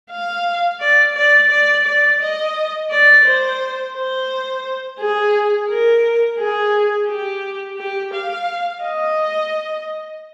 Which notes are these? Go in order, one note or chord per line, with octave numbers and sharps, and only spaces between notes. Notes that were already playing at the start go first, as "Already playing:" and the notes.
F5
D5
D5
D5
D5
D#5
D5
C5
C5
G#4
A#4
G#4
G4
G4
F5
D#5